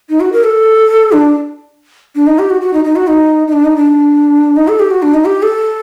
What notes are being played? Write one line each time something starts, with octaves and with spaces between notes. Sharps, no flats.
D#4
F#4
A#4
A4
D4
D4
D#4
G4
F#4
F#4
D#4
D#4
F#4
D#4
D#4
D4
D#4
D4
D#4
A4
G4
F#4
D4
D#4
G4
A4